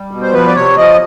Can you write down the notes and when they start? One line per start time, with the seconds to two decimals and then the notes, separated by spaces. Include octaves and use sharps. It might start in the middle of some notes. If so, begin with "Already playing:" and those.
Already playing: G3
0.11 B2
0.22 C5
0.33 F3 B4
0.48 D5
0.56 C3 C#5
0.77 F3 D#5